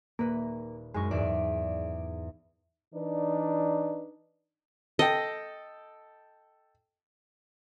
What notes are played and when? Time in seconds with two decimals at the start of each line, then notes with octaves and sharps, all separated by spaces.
0.19 D#1 A#3 B4
0.94 F#2 G#3 D#4 C#6
1.11 E2 G#2 D5
2.94 E3 D4 D#4 B4 D5
4.99 A4 D#5 G5